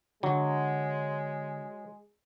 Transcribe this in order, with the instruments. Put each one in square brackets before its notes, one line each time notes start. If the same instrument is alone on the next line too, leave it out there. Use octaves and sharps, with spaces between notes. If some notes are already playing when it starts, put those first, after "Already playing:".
[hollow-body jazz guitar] D3 [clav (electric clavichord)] F#3 [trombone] G#3